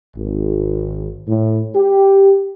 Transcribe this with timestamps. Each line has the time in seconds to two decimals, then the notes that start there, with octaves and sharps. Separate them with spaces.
0.16 G#1
1.27 A2
1.75 G4